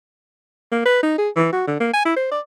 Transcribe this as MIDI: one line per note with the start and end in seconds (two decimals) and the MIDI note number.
0.72 0.84 58
0.85 1.01 71
1.03 1.14 63
1.18 1.29 68
1.36 1.48 52
1.52 1.64 66
1.67 1.78 50
1.80 1.91 58
1.93 2.02 80
2.05 2.12 64
2.16 2.27 72
2.31 2.40 74